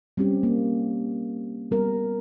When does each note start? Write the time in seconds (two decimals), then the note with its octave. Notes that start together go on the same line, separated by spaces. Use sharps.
0.17 G3 C4 C#4 G4
0.43 A#3
1.71 G3 B3 A#4